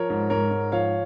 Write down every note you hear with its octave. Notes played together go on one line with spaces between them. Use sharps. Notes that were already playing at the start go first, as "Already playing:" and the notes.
Already playing: F3 A#4 C#5
G#2
G#2 A#4 C#5
G#2
F3 C#5 F5